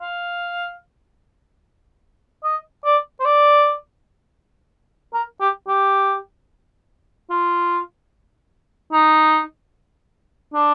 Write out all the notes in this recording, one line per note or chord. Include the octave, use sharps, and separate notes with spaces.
F5
D#5
D5
C5
D5
A#4
G4
G4
F4
D#4
D4